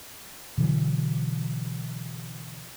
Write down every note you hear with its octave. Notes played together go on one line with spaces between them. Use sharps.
B2 D3 E3 F#3